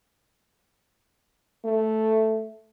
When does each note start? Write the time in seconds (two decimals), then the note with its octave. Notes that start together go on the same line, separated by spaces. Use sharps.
1.65 A3